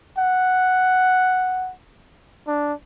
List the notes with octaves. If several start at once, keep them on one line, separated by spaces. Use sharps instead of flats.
F#5
D4